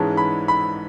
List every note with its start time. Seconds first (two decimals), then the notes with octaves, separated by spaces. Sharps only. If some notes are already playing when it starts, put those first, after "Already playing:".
Already playing: G#2 E3 G#3 C#4 A5
0.17 B5
0.48 B5